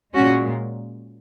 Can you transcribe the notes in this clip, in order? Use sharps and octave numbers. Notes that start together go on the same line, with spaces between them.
A#2 G#3 C#4 F#4